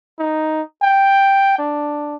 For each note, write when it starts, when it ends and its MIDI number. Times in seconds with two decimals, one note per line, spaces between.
0.19 0.62 63
0.82 1.54 79
1.59 2.16 62